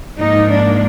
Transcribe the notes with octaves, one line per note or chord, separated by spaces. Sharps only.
G#2 F3 A#3 D#4
D4